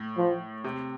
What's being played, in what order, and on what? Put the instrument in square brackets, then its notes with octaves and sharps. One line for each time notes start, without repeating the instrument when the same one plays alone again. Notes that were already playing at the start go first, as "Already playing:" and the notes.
Already playing: [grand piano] A2
[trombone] F3
[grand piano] C3